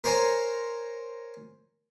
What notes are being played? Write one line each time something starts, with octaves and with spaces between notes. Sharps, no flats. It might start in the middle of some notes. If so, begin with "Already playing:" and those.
A#4 C5 C#5 G#5 A#5